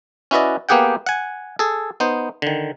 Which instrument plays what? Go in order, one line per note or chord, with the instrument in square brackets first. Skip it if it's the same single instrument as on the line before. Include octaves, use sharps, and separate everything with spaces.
[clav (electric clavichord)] C#4 E4 F#4 B4 D5 D#5
A#3 B3 G4 G#4 F#5 G5
F#5 G#5
G#4 A4
B3 D#4 C5
D3 D#3